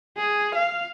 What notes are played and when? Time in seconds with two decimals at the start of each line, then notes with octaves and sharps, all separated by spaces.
0.18 G#4
0.55 F5